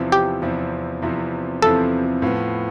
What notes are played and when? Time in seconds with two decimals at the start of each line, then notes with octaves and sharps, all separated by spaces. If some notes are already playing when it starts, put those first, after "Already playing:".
Already playing: E2 C3 F3 C4 E4
0.12 G4
0.42 E2 C3 F3 C4 E4
1.02 E2 C3 F3 C4 E4
1.62 E2 C3 F3 C4 E4 A4
2.22 A2 F3 B3